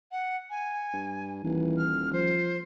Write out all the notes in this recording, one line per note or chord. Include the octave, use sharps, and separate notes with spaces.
F#5
G#5
G2
D#1 E3
F6
F3 C5